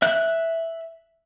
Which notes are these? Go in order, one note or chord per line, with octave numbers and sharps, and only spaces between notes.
E5 F#6